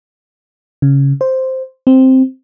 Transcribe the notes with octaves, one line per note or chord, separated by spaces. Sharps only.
C#3
C5
C4